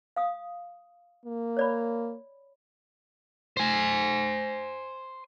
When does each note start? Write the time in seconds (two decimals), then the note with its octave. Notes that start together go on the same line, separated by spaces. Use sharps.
0.16 F5 D#6
1.25 A#3
1.57 C#5 D5 B5
3.57 C5 G#5